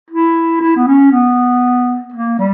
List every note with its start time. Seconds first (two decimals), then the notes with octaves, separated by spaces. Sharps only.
0.10 E4
0.61 E4
0.76 B3
0.87 C#4
1.12 B3
2.13 A#3
2.39 G3